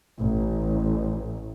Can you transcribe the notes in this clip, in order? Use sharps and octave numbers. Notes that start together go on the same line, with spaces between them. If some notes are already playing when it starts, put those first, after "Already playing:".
A1